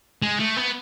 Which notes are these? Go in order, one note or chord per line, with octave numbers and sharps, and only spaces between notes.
G#3
A3
B3